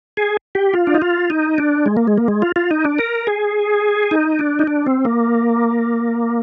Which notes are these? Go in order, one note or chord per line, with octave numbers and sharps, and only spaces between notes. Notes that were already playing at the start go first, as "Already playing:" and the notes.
G#4
G4
F4
D4
D#4
F4
D#4
D4
G#3
A#3
G#3
A#3
G#3
F4
F4
D#4
D4
A#4
G#4
D#4
D4
D#4
D4
C4
A#3